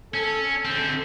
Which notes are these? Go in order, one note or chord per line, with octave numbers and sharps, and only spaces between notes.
C#4 A4
D3 C4